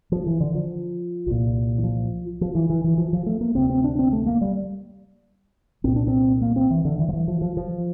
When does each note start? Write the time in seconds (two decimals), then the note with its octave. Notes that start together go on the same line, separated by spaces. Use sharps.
0.12 F3
0.27 E3
0.40 D3
0.55 F3
1.27 C2 A#2
1.78 E3
1.84 F3
2.41 F3
2.55 E3
2.70 E3
2.84 E3
2.98 F3
3.13 F3
3.26 A3
3.41 A#3
3.55 D2 C3 C4
3.70 C4
3.84 D4
3.99 C4
4.12 A3
4.26 A#3
4.41 G3
5.84 C2 A#2 C4
5.96 D4
6.08 C4
6.42 A#3
6.56 C4
6.70 E3
6.85 D3
6.99 E3
7.09 F3
7.13 E3
7.28 F3
7.41 F3
7.57 F3